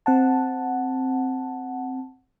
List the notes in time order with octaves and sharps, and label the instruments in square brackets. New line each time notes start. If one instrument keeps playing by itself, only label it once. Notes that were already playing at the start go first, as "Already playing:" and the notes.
[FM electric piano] C4 F#5 A5